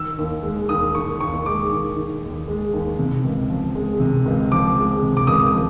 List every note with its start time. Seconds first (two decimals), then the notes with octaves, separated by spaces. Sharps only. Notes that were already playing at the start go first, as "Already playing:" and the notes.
Already playing: D#3 E6
0.19 D#2
0.43 G#3
0.69 D#2 D#6
0.95 D#3 C#6
1.21 D#2 C#6
1.46 G#3 D6
1.71 D#2
1.96 D#3
2.23 D#2
2.48 G#3
2.73 D#2
2.99 C3
3.24 C#2
3.50 F3
3.75 G#3
4.00 C3
4.26 C#2
4.51 F3 D6
4.77 G#3
5.02 C3
5.17 D6
5.27 C#2 D#6
5.53 F3